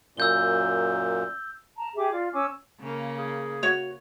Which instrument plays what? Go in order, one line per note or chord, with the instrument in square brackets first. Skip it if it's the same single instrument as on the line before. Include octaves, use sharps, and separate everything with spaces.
[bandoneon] F#2 A#2 [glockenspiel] E6 G6 G7
[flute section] A5 A#5
G4 G#4 E5 D6
F4 D5
C#4 G#5 D6 E6
[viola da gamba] C#3 A#3
[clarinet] G#4
[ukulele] F#4 C#5